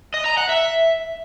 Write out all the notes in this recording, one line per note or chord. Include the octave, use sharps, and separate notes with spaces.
D#5
A#5
F#5
E5